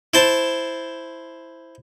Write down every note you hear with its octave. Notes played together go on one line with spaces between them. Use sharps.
E4 C5 A5